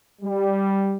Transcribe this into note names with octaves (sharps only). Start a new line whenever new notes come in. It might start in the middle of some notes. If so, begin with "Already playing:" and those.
G3